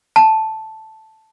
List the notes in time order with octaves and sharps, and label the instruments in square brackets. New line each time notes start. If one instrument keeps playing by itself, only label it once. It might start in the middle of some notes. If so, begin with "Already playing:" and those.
[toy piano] A5